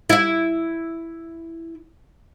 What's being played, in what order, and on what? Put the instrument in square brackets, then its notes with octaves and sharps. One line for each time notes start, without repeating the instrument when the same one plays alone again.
[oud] E4 E5